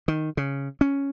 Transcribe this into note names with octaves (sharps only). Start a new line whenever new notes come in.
D#3
C#3
C#4